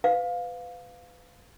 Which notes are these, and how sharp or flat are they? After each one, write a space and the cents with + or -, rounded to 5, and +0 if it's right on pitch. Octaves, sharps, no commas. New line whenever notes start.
B4 +25 F5 +15